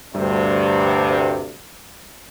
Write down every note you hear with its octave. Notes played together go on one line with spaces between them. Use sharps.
D2 G2 C3